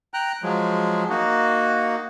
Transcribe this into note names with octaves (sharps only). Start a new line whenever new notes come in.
G5 A#5 F#6
F3 F#3 G#3
A#3 D#4 F#4